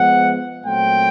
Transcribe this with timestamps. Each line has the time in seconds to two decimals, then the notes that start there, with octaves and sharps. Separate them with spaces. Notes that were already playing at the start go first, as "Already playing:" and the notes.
Already playing: F3 G#3 B3 F#5
0.64 A#2 F#3 A3 C4 G5